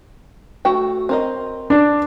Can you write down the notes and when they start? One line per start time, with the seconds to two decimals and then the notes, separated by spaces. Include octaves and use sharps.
0.65 A3 F#4 G5
1.09 C4 A#4 D#5
1.70 D4